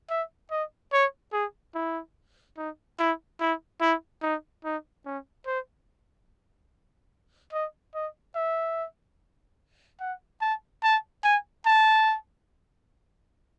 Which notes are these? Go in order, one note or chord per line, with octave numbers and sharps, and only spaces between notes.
E5
D#5
C#5
G#4
E4
D#4
E4
E4
E4
D#4
D#4
C#4
C5
D#5
D#5
E5
F#5
A5
A5
G#5
A5